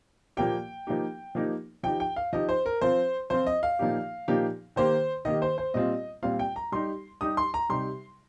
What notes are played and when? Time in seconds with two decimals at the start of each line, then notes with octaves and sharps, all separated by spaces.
0.37 A#2 F3 A#3 G4 G5
0.87 F3 A#3 D#4 G4
1.35 F3 A#3 D#4 G4
1.83 F3 D#4 G4 G5
2.00 G5
2.16 F5
2.33 F3 D#4 G4 D#5
2.49 C5
2.66 A#4
2.81 F3 C4 F4 C5
3.30 F3 C4 F4 C5
3.46 D#5
3.63 F5
3.79 A#2 F3 A#3 D#4 G4
4.28 A#2 F3 A#3 D#4 G4
4.76 D#3 A#3 G4 C5
5.25 D#3 A#3 G4 D#5
5.42 C5
5.58 C5
5.74 A#2 G3 C4 F4 D#5
6.23 A#2 G3 C4 F4 F5
6.39 G5
6.56 A#5
6.72 G3 D#4 G4 C6
7.21 G3 D#4 G4 D#6
7.37 C6
7.54 A#5
7.69 C3 G3 D#4 G4 C6